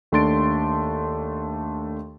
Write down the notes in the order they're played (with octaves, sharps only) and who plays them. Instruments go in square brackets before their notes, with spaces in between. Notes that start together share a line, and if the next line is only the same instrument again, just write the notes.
[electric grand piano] D#2 A3 D4 C6 A6 D7